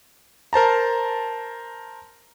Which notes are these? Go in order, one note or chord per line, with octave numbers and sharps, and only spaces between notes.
A#4 C5 A5 A#5